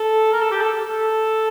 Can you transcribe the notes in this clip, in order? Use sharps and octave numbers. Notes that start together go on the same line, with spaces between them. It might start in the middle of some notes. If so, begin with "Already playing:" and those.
Already playing: A4
A#4
A4
G4
A4
A4